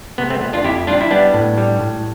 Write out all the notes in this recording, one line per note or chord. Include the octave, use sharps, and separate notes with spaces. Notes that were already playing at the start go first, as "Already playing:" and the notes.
C3 B3
A3 C4
F2 B3
D4 F4
F2 E4 G4
G3 D4 F4
E4
G3 B3 D4
A2
G3
A2